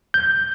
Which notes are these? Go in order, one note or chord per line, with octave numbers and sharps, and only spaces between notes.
G6